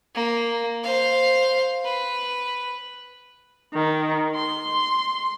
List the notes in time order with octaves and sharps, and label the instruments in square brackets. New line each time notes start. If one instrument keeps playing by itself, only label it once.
[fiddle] A#3
C5 F5
B4
[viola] D#3
C6